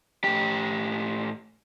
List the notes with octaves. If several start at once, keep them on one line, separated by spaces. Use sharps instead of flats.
A2 G4